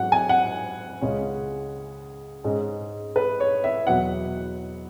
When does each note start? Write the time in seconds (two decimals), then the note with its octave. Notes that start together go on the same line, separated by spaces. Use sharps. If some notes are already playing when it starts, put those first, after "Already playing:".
Already playing: G#2 F#3 C#4 F#5
0.12 G#5
0.29 F#5
1.01 C#2 C#3 G#3 C#4
2.44 G#2 G#3 C#4
3.16 B4
3.40 C#5
3.64 E5
3.87 E2 B2 F#3 B3 F#5